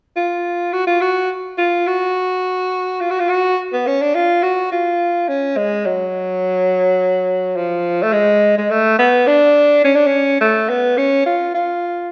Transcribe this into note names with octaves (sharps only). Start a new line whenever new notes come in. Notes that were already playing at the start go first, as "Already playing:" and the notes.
F4
F#4
F4
F#4
F4
F#4
F4
F#4
F4
F#4
B3
C#4
D4
F4
F#4
F4
C#4
G#3
F#3
F3
A3
G#3
G#3
A3
B3
D4
C#4
D4
C#4
A3
B3
C#4
F4
F4